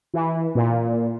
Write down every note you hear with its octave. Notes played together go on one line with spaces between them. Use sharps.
E3
A#2